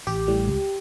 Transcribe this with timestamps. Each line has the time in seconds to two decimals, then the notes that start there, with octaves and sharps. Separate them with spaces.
0.07 A1 G4
0.28 A2 G3
0.48 C#2